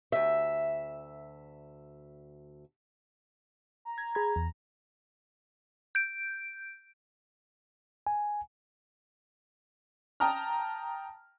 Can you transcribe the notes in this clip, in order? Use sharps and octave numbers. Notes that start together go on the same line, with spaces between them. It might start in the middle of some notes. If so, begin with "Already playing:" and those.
D2 E5
A#5
G#6
G#4 B5 G#6
E2
G6 D7
G#5
G5 A5 A#5 D#6 F6